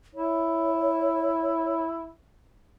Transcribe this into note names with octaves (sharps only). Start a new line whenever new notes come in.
E4 C#5